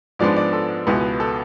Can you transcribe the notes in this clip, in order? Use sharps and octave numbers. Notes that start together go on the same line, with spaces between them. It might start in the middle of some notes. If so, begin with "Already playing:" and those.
G#2 F3 G#3 B3 D4 D5
D5
A4
C#2 B2 G#3 B3 E4
A4